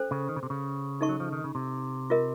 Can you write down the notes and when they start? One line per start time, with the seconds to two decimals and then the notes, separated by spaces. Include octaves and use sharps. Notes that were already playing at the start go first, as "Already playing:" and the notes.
Already playing: C#4 A4 C5
0.11 C#3
0.29 D#3
0.36 C#3
0.43 C3
0.50 C#3
1.01 D#4 A4 D#5 A5 C#6
1.09 F#3
1.20 F3
1.32 D#3
1.44 C#3
1.55 C3
2.10 F4 A#4 D#5